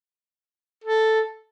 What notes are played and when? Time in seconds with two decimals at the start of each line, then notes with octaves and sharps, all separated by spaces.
0.84 A4